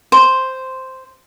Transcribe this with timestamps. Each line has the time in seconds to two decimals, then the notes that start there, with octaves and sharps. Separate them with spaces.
0.12 C5